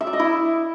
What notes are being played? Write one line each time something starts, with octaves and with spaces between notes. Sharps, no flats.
E5
D5
D#5
E4